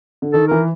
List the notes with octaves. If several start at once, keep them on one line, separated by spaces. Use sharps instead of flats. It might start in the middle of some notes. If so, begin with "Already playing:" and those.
D3
D#3 A4
E3 A#4